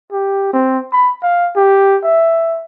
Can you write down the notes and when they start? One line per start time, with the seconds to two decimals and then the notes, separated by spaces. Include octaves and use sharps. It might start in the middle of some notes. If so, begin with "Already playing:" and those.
0.12 G4
0.53 C4
0.93 B5
1.23 F5
1.56 G4
2.04 E5